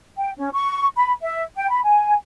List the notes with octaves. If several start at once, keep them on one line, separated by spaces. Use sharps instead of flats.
G5
C#4
C#6
B5
E5
G5
B5
G#5